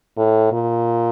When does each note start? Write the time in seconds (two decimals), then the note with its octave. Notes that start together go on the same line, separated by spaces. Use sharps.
0.17 A2
0.52 A#2